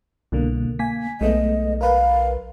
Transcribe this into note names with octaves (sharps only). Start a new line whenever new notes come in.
C2 B2 D3 A#3
A#3 G#5 B6
B1 G#3 A3 B3 D#5
A#4 B4 F5